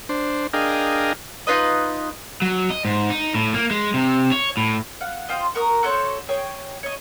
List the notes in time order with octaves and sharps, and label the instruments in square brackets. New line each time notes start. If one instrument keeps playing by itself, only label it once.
[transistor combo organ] D4 C5
D4 G#4 A#4 D#5 F5 G5
[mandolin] D#4 F4 B4 D#5
[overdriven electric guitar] F#3
D#5
G#2
D#4
A2
A#3
G#3
C3
C#5
A2
[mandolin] F5 F#5
F4 G4 C5 D#5
F#4 A#4 A#5 D#6
F#4 A4 C5 C#5
G#4 C#5 G5
C#5 D#5